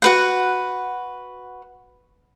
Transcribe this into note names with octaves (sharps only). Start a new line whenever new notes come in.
F#4 B4 F#5